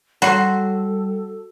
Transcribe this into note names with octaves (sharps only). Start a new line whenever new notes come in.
F#3 G3 F#4 A4 C6